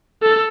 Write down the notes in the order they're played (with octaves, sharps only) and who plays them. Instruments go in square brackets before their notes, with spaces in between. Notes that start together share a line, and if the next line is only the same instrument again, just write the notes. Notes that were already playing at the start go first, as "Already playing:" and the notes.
[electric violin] A4